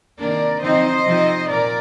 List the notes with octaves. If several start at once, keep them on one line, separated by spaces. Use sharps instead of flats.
C3 D#3 A#3 D4 A#4 D5
D3 F3 C4 D#4 C5 D#5
C3 F3 C4 D#4
A#2 F3 A#4 D5